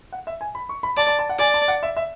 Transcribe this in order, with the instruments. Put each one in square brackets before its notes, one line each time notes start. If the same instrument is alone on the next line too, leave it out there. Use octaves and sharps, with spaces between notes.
[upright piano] F#5
E5
G#5
B5
C#6
B5
[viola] D5 [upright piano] A5
[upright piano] A5
A5
F#5
[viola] D5 [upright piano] G#5
[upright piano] A5
F#5
E5
E5